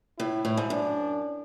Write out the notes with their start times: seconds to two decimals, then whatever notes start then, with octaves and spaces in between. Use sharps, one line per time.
0.19 A2 E4
0.45 A2
0.57 G#2
0.70 F#2 D4